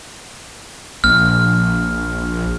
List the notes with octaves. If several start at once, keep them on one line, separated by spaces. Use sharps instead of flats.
A#1 F6